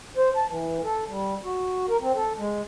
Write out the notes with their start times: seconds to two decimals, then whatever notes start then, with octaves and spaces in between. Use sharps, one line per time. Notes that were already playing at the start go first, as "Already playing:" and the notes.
0.17 C5
0.36 A5
0.49 E3
0.84 A4
1.08 G3
1.44 F#4
1.89 A#4
2.02 C4
2.15 A4
2.38 G#3